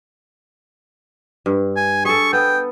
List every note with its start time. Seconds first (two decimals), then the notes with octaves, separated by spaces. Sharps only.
1.46 G2
1.76 G#5
2.05 G#4 A4 C#6
2.33 B3 G5